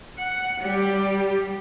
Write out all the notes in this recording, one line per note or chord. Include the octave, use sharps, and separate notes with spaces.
F#5
G3 G4